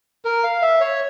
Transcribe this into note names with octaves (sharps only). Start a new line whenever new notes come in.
A#4
F5
E5
C#5